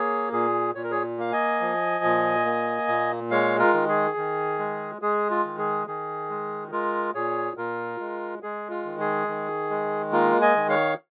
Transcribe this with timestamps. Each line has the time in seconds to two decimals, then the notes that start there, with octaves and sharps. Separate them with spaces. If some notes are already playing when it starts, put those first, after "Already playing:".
Already playing: A#3 G#4 C#5
0.32 A#2 G#4
0.75 A#2 C#5
0.84 A#4
0.91 G#4 C#5
1.18 A#3 F5
1.32 D#5 G#5
1.61 F3
2.04 A#2
2.45 A#3
2.88 A#2
3.31 G#3 C#5 F5
3.59 F4 A#4
3.74 D#3
3.89 G#4
4.17 D#3
4.59 G#3
5.02 G#3 G#4
5.31 F4
5.45 D#3
5.58 G#4
5.87 D#3 G#4
6.30 G#3
6.72 G#3 F4 A#4
7.15 A#2 G#4 C#5
7.57 A#2 F4 A#4
7.99 G#3
8.42 G#3 G#4
8.70 F4
8.85 D#3
9.00 G#4
9.28 D#3
9.70 G#3
10.12 A#3 F4 A#4
10.41 D#5 G#5
10.56 D#3
10.69 C#5 F5